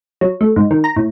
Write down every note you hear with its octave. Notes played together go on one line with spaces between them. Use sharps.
F#3
A3
G#2
D#3
A#5
A2